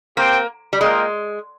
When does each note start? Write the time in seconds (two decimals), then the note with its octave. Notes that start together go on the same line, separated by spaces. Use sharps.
0.17 A#3 C4 G4 C5 G5
0.73 G3
0.81 G#3 A#3 F4 A#4 D#5 G5